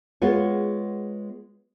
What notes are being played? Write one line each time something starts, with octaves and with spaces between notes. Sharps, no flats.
G#3 B3 F4 C#5